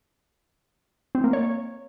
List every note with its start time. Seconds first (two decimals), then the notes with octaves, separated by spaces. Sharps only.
1.15 C4
1.24 A#3
1.33 C#5